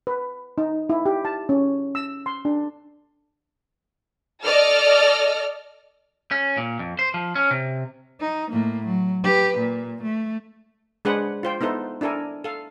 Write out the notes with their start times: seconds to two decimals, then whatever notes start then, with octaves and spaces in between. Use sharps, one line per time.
0.07 B4
0.58 D#4
0.90 E4
1.06 G4
1.25 A5
1.49 C#4
1.95 E6
2.26 C6
2.45 D4
4.43 A4 D5 D#5 F6
6.31 C#4
6.57 A#2
6.79 F2
6.99 C5
7.14 F3
7.35 C#4
7.51 C3
8.21 D#4
8.51 A2 A#3
8.86 F#3
9.24 G4 B4
9.58 A#2
10.02 A3
11.05 G#3 D4 G#4 B4 C5 F#5
11.43 F4 C5 G5
11.61 B3 D#4 E4 A4 C5
12.01 D4 E4 A4 A#4 G#5
12.44 A4 F5